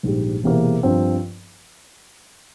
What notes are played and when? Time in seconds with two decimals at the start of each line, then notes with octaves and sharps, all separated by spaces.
0.03 A#1 G#2 G3
0.43 E1 E2 C3 E3 A#3
0.83 G2 F3 C4 F4